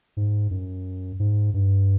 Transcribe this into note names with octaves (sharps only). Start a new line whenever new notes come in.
G#2
F#2
G#2
G2